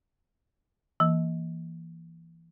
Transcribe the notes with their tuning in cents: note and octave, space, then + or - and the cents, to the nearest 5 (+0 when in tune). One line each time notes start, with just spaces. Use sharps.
E3 +15 A#3 +0